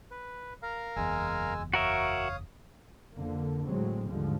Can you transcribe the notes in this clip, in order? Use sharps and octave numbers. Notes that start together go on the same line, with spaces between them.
B4
A#4 F5 A#5
F#1 E2 G#3 G#5 E6
F#4 A#4 C#5 E5 F5 D#6
F2 D3 A#3
A2 D3 F#3 G#3 C4
D#2 G#2 D3 F3 G3 G#3